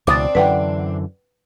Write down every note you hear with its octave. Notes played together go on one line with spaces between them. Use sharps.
C#2 B2 E3 C4 D4 D6 D#6 A6
F#2 D3 E3 B4 F#5 G5